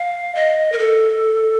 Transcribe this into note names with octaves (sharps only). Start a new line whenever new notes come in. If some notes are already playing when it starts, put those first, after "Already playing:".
Already playing: F5
D#5
A#4
A4